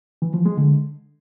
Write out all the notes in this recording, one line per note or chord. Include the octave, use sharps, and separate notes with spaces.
E3
F3
G#3
D3